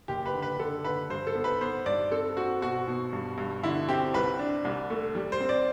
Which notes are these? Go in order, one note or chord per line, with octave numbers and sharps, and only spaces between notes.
F#1 G4
B4
D3
B4
D3 A4
D3 B4
G2 C5
A4
B3
B4
B3 C5
G2 D5
C4 A4
C4 F#4
B2 F#4
B2
G2
G2
D3 E4
C4 G4
C2 B4
D4
C2
A3
G3
C5
C4
D5